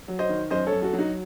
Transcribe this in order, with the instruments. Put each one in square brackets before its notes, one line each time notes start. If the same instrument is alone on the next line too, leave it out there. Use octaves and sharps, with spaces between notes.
[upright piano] F#3
C5 D#5
D#3
F#2 C5 D#5
F#2 A4 C#5
F#4 A4
F#3
D#4 F#4